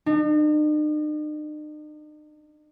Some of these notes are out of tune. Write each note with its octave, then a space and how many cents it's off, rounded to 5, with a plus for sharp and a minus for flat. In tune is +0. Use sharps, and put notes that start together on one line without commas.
D#4 -45